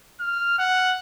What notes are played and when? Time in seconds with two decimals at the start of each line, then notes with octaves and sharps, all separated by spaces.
0.20 F6
0.58 F#5